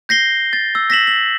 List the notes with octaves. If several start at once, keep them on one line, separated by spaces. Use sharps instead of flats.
G6 A#6 C7 G7
A6
E6
A#6 B6 E7 F#7
F#7